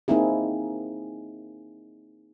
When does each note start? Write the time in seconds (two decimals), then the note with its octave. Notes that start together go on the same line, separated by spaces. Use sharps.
0.08 A#3 C4 D#4 E4 G#4